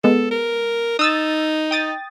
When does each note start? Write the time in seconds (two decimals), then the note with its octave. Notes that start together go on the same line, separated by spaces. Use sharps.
0.04 G#3 B3 A4
0.31 A#4
0.99 D#4 D#6 E6 A6
1.71 G5 D#6 A6